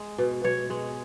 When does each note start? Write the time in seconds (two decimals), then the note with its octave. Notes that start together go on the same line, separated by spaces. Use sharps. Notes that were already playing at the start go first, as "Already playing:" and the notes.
Already playing: G#3
0.18 B2
0.44 B2 C#5
0.70 G#3